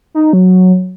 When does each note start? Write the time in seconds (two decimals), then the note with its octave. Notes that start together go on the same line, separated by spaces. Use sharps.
0.14 D#4
0.33 F#3